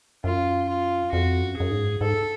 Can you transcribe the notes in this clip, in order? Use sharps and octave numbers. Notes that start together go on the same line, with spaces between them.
F#2 F4
F4
F2 F#4
F#2
F#2 G#4
G#2
G#2 A4